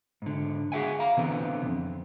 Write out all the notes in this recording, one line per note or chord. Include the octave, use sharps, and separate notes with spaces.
G#2 D3
F#4 G#4 E5 F#5 G#5
F5 A#5
B2 D3 E3 B3 C4
F2